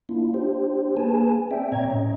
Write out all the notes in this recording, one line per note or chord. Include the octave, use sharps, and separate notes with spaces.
A#3 D4 E4 F4
D4 G4 C5
A#3 G#4 B4 G#5 A5
C4 D5 E5 G5
A#2 C#5 A#5 G#6
A2 C#4 D#5